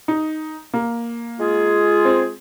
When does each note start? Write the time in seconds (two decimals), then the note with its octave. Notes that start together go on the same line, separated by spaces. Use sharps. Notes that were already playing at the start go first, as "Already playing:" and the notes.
0.08 D#4
0.74 A#3
1.39 G#3 F4 G#4
2.05 C4